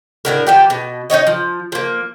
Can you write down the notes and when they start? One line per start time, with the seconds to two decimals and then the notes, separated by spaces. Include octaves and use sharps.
0.25 A2 D3 A#4
0.47 F3 B3 G4
0.70 B2
1.10 D#4 F4 C#5 D#5
1.27 F3
1.72 F3 A#3